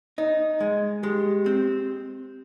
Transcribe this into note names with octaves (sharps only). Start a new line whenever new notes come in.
D#4 D#5
G#3
G#3 G4
C4